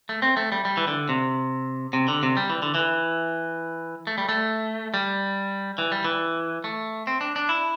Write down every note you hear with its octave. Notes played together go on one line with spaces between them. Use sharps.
A3
C4
A3
G3
G3
E3
D3
C3
C3
D3
C3
G3
E3
D3
E3
A3
G3
A3
G3
E3
G3
E3
A3
C4
D4
D4
E4